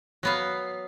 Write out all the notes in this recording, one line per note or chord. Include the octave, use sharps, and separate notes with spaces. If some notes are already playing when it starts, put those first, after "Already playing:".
F#3 B3 F5